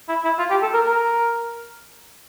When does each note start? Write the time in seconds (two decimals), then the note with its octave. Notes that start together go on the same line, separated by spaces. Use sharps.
0.09 E4
0.24 E4
0.39 F4
0.50 G4
0.62 A4
0.74 A#4
0.85 A#4